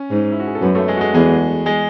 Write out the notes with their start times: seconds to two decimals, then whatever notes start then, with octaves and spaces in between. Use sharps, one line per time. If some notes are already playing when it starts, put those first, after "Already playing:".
Already playing: C#4
0.11 G#2
0.32 E4
0.40 F#4
0.48 G#4
0.55 A4
0.62 F#2 B3 B4
0.75 A3 A4
0.88 G#3 G#4
0.97 F#4
1.01 G#3 G#4
1.14 E2 G#3 G#4
1.66 G#3 G#4